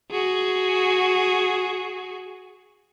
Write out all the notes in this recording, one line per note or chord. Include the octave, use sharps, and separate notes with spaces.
F#4 G#4